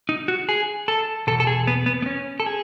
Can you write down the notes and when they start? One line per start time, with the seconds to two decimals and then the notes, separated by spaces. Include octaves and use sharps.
0.09 D#4
0.28 F#4
0.49 G#4
0.88 A4
1.27 E2 B2 A4
1.40 A4
1.47 G#4
1.67 B3
1.86 B3
2.02 B3
2.06 C#4
2.40 A4
2.46 G#4